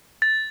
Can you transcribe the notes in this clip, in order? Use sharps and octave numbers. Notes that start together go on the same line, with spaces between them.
A6